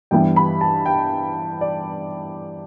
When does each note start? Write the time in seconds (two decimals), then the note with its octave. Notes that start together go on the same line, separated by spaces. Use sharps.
0.11 G2 E3 G3 B3 E4 G5
0.36 B5
0.61 A5
0.86 G5
1.61 D5